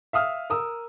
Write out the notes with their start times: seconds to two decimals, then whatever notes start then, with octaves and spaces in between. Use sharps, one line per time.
0.13 E5 F5 D#6 F6
0.50 A#4 D#6 E6